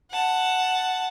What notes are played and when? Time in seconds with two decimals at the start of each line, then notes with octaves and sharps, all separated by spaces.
0.10 F#5 A5